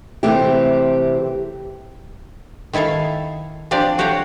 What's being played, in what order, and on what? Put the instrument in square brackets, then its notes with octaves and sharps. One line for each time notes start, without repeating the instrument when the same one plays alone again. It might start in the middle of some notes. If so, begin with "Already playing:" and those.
[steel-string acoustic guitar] C3 E3 A3 C4 G4
[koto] D#3 E4 A4 E5 F5
F3 C4 D4 G4 D5
A3 F#4 G4 C#5 F5 G5